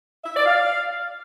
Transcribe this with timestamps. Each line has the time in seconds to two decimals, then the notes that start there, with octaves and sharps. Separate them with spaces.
0.24 E5
0.35 D5
0.46 F5